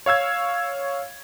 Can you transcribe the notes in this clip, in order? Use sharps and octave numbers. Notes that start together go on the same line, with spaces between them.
C#5 F5 E6 G#6